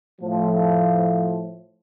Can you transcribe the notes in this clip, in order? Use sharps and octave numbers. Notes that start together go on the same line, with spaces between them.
A2 F3